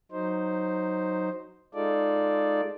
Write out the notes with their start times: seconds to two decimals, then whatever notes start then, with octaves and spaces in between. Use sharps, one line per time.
0.11 F#3 D#4 C5
1.74 G#3 D#4 F4 A4 D5